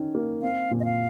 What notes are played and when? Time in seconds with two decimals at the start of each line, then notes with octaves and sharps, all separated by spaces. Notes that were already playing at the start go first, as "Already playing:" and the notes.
Already playing: D#3 C#4
0.15 A#3
0.42 C4 F5
0.71 A#2
0.80 D#5
0.85 F5